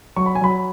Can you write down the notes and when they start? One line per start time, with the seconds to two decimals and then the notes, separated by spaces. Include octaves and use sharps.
0.16 F#3 C#6
0.26 B5
0.35 G#5
0.41 F#3 B5